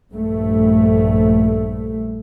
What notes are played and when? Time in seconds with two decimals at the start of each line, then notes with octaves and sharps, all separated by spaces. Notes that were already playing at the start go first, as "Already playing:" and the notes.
0.12 A#1 G2 A3